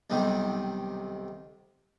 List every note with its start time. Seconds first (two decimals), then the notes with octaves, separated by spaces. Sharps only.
0.10 B1 C3 D#3 G3